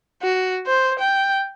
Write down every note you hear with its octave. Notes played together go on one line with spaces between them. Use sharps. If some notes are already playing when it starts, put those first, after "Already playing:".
F#4
C5
G5